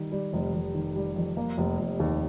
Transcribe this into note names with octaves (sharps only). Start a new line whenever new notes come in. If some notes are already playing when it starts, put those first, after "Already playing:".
Already playing: D#3 G3
G3
F1
F1
D#3
G3
F2
A#3
F1
F1
D#2